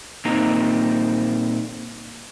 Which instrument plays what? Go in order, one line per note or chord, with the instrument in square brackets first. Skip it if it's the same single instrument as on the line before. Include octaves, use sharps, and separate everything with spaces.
[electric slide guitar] A#2 A#3 C4 D#4 A#5